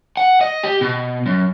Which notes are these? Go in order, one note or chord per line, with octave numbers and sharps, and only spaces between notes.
F#5
D#5
G4
B2
F#2